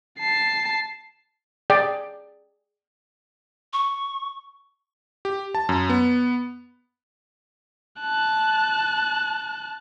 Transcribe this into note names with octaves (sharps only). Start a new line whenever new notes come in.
A5 C7
G#4 D5 G5
C#6
G4
A5
F#2
B3
A5 F#6